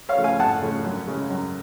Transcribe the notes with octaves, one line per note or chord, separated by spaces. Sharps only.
C#5 F5
C#3 F3 A3
F5 G#5
F2 F#5 A5
C#3 F3 A3
F#2
C#3 G#3
F#2